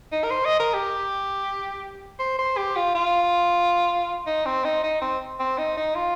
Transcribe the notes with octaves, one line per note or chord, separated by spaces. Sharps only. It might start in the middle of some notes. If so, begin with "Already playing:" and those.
D#4
A#4
C5
D#5
A#4
G4
C5
C5
G4
F4
F4
D#4
C4
D#4
D#4
C4
C4
D#4
D#4
F4